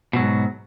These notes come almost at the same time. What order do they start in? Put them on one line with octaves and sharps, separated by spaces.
B2 F#3 G#2